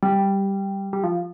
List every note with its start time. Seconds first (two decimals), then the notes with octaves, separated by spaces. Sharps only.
0.03 G3
0.93 G3
1.04 F3